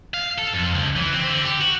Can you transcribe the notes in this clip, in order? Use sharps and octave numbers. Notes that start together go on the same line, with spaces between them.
F5
A4
F2
C#2
E3
C4
D3
G4
F#4